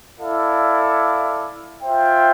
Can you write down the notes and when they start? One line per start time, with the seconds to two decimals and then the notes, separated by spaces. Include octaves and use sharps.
0.20 E4 A4 D5 F5
1.83 F4 C5 E5 G5